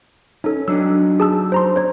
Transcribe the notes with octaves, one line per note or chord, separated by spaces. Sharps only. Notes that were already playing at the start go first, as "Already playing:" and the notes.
C#4 D#4 A4
F#3 D4 D#4 E6
G#4 A5 E6
C5 A#5 C6
C5 C#5